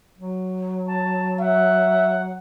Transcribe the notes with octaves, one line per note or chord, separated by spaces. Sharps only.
F#3
A5
E5 F#5